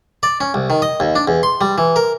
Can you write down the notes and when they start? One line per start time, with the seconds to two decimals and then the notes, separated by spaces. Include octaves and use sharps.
0.23 D5
0.41 C#4
0.54 C2
0.70 D#3
0.82 D#5
1.00 D#2
1.15 D4
1.28 E2
1.43 C6
1.61 G3
1.78 E3
1.96 A#4